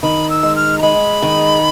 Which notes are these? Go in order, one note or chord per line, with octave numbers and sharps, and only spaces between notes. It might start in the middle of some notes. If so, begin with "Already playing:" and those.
D#3 B5
E6
G#3
F6
A#5
G#3 B5
D#3